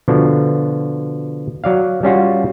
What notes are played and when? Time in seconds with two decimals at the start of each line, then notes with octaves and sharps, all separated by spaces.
0.08 B2 D3 F3
1.64 F#3 D5 F5
2.03 G3 C#4 F4 F#4